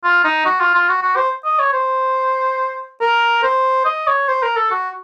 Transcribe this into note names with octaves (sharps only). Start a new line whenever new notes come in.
F4
D#4
F#4
F4
F4
F#4
F#4
C5
D#5
C#5
C5
A#4
C5
D#5
C#5
C5
A#4
A4
F#4